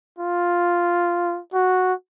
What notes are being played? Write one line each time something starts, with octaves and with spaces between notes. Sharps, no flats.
F4
F#4